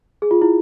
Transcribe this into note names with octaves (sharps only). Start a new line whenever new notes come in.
G#4
F4
E4